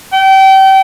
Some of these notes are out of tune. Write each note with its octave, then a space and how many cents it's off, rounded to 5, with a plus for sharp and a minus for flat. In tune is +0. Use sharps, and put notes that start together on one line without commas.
G5 -30